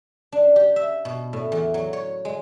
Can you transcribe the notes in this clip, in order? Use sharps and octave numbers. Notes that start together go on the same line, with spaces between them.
D4
G4
E5
B2
A2
E2
F#3
C#5
G#3